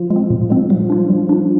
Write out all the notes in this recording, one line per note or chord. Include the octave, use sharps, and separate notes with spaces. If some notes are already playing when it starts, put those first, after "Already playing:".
Already playing: F3
G#3
C4
A#2
G#3 C4
F3 G3
D4 F4
G3
D4 F4